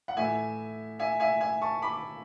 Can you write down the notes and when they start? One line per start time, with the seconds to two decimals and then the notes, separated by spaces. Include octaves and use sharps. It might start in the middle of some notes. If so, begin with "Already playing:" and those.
0.08 F#5
0.17 A2 E3 E5 G#5
0.99 E5 G#5
1.20 E5 G#5
1.41 E5 G#5
1.62 A5 C#6
1.82 B5 D6